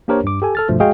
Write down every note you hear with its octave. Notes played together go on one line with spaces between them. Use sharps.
A#3 D4 G4 A#4 C5 C#5
G2 D6
G4 A4 G#5
A4 F6 A6
G2 B2 F3 A3
G#3 F#4 G#4 D#5 F5 G5